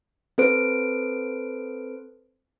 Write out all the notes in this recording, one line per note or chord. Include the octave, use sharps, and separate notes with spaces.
C4 A4 B4 C5 D7